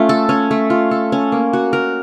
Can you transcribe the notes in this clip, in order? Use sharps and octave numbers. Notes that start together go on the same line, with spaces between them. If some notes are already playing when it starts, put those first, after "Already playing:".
Already playing: A3 C#4 F4
A4
C#4
A3
F4
A4
C#4
A#3
F#4
A#4